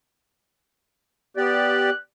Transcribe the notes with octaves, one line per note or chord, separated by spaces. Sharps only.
B3 G4 D5 F#6